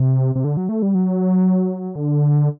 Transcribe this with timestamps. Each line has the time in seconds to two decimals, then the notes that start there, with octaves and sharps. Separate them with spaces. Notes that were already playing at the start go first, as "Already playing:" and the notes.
Already playing: C3
0.35 C3
0.44 D3
0.57 F#3
0.69 A3
0.82 G3
0.95 F#3
1.96 D3